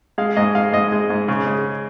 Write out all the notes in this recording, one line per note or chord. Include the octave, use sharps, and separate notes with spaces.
G#3 F5
G#2 D#5
G#3 F5
G#2 D#5
G#3
G#2
C#3
G#3